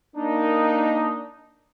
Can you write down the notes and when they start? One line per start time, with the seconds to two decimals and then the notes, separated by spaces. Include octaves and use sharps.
0.17 A#3 D4 D#4